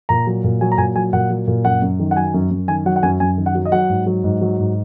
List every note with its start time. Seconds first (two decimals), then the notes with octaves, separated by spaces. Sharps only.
0.09 A#2 A#5
0.27 F#3
0.44 A#2
0.61 F#3 G#5
0.72 A#5
0.78 A#2 G#5
0.95 F#3 G#5
1.13 A#2 F#5
1.30 F#3
1.47 A#2
1.65 F#2 F#5
1.82 F#2
1.99 D#3
2.11 F#5
2.16 F#3 G#5
2.34 F#2
2.51 F#2
2.68 D#3 G#5
2.86 F#3 F#5
2.96 F#5
3.03 F#2 G#5
3.20 F#2 G#5
3.38 D#3
3.46 F#5
3.55 F#3
3.65 D#5
3.72 F#3 F#5
3.89 G#2
4.06 F#3
4.24 G#2
4.41 F#3
4.59 G#2